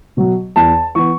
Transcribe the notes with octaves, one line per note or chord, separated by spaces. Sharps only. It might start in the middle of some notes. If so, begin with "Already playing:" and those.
B2 F#3
E2 A5
E3 B3 C#6